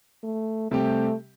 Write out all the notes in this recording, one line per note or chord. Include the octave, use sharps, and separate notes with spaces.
A3
C3 G3 A3 C4 G4